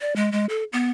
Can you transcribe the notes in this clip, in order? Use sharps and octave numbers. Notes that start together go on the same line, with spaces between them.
D5
G#3
G#3
A4
B3